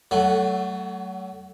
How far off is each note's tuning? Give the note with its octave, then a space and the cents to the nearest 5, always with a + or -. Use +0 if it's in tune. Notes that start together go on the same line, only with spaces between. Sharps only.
F#3 +30 A3 +0 F#4 +0